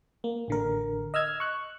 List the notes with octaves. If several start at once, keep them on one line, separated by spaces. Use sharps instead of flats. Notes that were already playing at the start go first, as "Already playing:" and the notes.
A#3
A1 D3 A#4
D#5 E6 F6 G#6
C#6 F#6